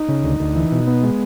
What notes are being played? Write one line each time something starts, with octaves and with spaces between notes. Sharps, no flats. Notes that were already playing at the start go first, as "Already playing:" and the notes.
Already playing: D#4
C#3
D2
D2
E3
B2
B3
G#3